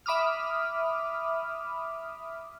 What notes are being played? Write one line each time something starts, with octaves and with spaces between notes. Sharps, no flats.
E5 B5 D6 D#6 F6